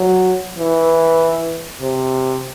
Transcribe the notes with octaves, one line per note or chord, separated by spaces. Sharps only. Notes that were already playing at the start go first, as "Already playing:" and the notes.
Already playing: F#3
E3
C3